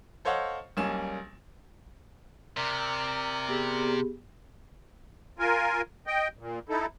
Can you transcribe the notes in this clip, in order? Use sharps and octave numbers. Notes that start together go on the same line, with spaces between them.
A4 C5 C#5 D#5 F5 F#5
B1 G3 A#3 C#4 G#5 E7
C3 A#4 D5
B3 G4 G#4
F4 A#4 G#5
D#5 G5
A#2
D#4 E4 A4